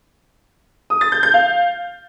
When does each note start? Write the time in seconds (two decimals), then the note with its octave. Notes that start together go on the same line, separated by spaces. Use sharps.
0.90 D#6
1.01 A6
1.12 G6
1.23 G6
1.34 F5